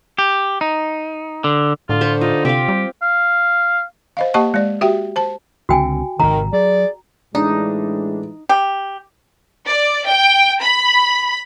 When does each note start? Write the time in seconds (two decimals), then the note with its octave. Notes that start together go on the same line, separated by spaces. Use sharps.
0.18 G4
0.61 D#4
1.44 D3
1.89 A2 D3 F4
2.01 C5 B5 C#6
2.21 D#4 F4
2.45 C3 C4 G4 F5
2.68 G3
3.02 F5
4.17 C5 D#5 F5
4.34 A#3 G4 D#5 F#5 A5 C#6
4.54 G#3 D5
4.81 F#4 G4 E5 G5
5.16 C5 A5
5.69 C#2 D3 C4 F#4 G5 G#5
6.20 G#1 C3 D#3 A#5
6.53 F#3 G#4 D5
7.35 A2 E3 G#3 D4 D#4
8.49 G4
9.66 D5
10.07 G5
10.62 B5